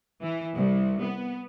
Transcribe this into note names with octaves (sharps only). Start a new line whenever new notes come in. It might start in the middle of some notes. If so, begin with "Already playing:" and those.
E3
C2
B3